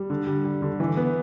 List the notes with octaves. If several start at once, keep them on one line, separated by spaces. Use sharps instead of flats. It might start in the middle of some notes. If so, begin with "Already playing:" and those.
Already playing: G3
D3
G3
G3
D3
E3
B3